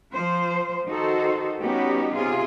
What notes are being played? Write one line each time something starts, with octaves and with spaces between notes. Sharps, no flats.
F3 C5
D#3 D#4 F#4 A4 C5
G3 B3 C#4 D#4 F#4 G4
C3 F4 G#4